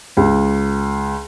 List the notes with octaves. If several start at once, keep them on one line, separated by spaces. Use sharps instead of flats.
C#2